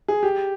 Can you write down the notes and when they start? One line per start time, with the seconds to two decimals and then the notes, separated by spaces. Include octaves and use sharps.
0.08 G#4
0.23 G4